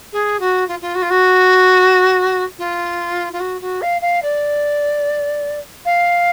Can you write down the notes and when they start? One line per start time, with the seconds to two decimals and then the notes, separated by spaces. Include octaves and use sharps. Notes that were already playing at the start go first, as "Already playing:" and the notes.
0.12 G#4
0.39 F#4
0.68 F4
0.81 F4
0.95 F#4
1.02 F4
1.10 F#4
2.58 F4
3.33 F4
3.40 F#4
3.61 F#4
3.81 F5
4.01 F5
4.22 D5
5.85 F5